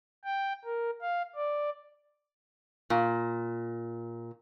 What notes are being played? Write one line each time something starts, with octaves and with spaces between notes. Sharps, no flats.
G5
A#4
F5
D5
A#2